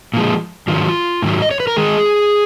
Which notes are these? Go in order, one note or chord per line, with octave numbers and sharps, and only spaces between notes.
A#2 F3 G#3
G#2 D#3 F#3 F4
G#2 D#3 F#3
D#5
C#5
B4
A#4
D#3 G#3 G#4